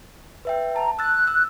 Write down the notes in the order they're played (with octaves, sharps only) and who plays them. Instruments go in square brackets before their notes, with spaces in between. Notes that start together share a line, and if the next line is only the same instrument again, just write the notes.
[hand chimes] B4 E5 G5
[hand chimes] A5 [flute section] A#5
[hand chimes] E6 A6 [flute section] F#6
[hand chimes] E6